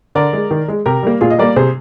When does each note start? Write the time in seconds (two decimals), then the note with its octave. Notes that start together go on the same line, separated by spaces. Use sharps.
0.15 D3 A#4 D5
0.33 G#3
0.51 D#3
0.68 G#3
0.86 C3 G4 A#4
1.03 G3 A#3
1.21 A#2 F4 G#4
1.30 D#5
1.38 G3 A#3 A#4 D5
1.56 C3 G#4 C5